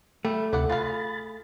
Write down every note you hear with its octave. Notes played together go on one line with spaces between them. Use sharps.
G3 A3
D2 C3 E4 A4 D5 F#5
F4 G#4 F5 B5 A6